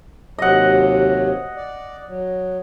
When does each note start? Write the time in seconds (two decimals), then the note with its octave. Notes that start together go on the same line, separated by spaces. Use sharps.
0.38 D#2 C3 F#3 D#5 F#5
1.56 D5
2.08 F#3